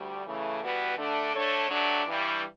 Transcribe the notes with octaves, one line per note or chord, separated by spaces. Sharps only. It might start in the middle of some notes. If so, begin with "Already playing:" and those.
Already playing: D2 G3
C#3 E3 A3
E3 G3 B3 F#4 B4
D3 A3 D4
D3 A3 D4 A4 C#5
G2 F#3 A3 D4
G2 E3 G3